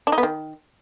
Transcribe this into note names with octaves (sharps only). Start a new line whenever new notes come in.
D4
D#4
B3
D#3